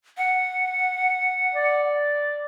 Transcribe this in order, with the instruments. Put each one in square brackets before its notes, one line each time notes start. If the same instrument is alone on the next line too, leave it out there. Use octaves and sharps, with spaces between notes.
[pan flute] F#5
[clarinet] D5